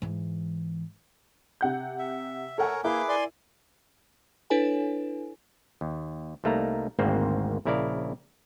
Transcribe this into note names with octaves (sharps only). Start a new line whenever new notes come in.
G#2 E3
C3 F#5 G6
E5
A3 A4 A#4 C#5 F#5 G#5
A#3 E4 G#4 A#4 B4 D6 G6
D5 G#5 C6
D4 E4 A4 B4 C#5 G#5
D#2
C2 G3 A3 A#3 D#4 A#5
G#1 D2 G#2 A#3 C4 C5
A#1 C#3 E4 A#4 D5 F5